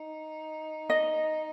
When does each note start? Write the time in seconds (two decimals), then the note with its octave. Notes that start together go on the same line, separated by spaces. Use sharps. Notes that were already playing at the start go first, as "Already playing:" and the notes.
Already playing: D#4
0.90 D#5